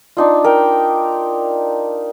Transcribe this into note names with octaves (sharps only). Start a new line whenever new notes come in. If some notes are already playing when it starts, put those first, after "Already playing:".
D4 D#4 F4
A#4 G5